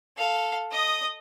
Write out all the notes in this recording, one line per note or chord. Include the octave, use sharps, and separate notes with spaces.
A4 F5
D#5 D#6